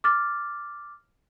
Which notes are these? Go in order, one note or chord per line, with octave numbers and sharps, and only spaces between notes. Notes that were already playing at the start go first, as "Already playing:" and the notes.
D6 F6 A6